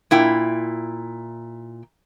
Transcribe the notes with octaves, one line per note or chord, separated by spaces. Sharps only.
A#2 E4 G5